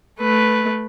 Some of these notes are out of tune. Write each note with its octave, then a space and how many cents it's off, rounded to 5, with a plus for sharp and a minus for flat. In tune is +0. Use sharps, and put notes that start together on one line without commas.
A3 -5 B4 +0